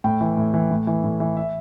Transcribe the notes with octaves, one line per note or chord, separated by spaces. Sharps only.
A2 G5
E3
A2
E3
A2
E3
A2
E3
E5